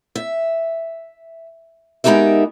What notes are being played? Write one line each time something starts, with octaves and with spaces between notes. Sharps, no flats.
E5
G#3 B3 D#4 G4 A#4 E5